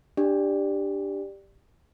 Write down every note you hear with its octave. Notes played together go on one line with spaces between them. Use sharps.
D4 G4 D5